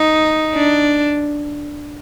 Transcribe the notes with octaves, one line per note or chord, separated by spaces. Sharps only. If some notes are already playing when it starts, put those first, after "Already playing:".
Already playing: D#4
D4